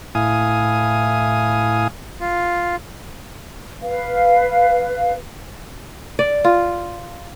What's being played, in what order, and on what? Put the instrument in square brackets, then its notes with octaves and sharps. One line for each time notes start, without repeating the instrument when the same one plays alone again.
[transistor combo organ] A2 E4 F5 G#5 D#6
[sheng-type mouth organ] F4
[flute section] B4 F5
[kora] D5
F4